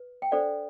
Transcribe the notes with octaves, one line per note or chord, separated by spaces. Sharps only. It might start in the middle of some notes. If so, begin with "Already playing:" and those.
Already playing: B4
G5
D4 A4 C5 D5 F#5